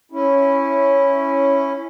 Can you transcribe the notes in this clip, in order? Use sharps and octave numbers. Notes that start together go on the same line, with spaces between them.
C#4 E4